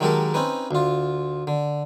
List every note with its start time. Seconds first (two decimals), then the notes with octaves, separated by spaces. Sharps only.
0.01 D#3 F#3 G#3 G4 A4 A#4
0.34 C4 C#4 D#4 B4
0.71 D2 F4
1.47 D3